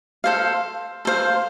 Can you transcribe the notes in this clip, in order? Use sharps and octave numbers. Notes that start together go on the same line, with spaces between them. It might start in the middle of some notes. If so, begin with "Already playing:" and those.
A4 C5 F5
A4 C5 F5